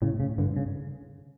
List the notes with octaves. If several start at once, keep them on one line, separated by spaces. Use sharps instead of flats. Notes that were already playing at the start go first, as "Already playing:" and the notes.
A2 C#3
C#3
G2 D3
C#3